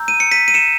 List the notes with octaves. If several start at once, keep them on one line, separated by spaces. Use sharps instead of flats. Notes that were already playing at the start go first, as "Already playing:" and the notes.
Already playing: A#5 E6 G6
D#7
C#7
B6 D#7
D#7
C#7 E7